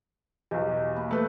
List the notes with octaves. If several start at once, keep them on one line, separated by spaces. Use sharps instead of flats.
B1 E2 G4 D#5
A#3 B5
A3 B4 A5 E6 F#6 G6